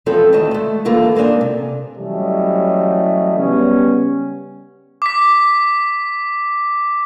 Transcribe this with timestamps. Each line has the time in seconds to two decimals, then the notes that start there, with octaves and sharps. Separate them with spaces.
0.06 E3 F3 G#3 C4 F4 A4
0.33 D2 D#3 A3 D#5 A5
0.51 G#3 A3
0.85 D3 E3 A#3 F4 A4 A#4
1.15 G#3 A#3 C4 D4 G#5
1.41 C3
1.97 E3 F#3 G3 A3 C#4 D#5
3.38 C#3 G3 B3 C#4
5.02 D6 B6